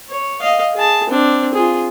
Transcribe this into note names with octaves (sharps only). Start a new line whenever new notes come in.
C#5
D#5 F5
G#4 A5
C4 D4
F4 G#4